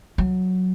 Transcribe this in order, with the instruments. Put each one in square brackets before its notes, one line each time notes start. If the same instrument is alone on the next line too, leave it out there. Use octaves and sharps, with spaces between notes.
[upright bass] F#3